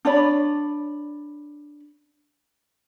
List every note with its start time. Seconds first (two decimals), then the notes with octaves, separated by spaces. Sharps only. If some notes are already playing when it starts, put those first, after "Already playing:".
0.05 D4 C#5 D5 B5